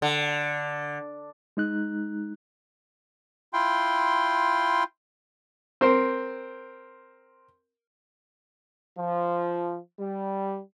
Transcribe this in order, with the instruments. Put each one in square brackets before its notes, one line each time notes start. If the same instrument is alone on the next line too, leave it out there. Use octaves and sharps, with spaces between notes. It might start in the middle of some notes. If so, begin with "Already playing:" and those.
[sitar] D3
[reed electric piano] G#3 D#4 F#6
[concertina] E4 F4 G5 C6
[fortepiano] C4 A#4 C5
[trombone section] F3
G3